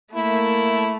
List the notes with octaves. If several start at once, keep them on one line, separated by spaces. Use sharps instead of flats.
A3 A#3 E4